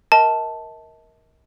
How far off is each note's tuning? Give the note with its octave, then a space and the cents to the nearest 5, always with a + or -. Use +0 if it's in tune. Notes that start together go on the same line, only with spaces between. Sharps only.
A#4 +10 D#5 +40 A5 +0